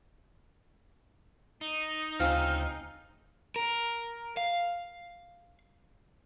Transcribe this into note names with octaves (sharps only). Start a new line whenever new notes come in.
D#4
D2 C#3 C4 F4 F6
A#4
F5